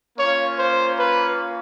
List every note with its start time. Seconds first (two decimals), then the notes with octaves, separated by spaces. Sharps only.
0.18 A#3 C#4 F4 C#5
0.58 C5
0.98 B4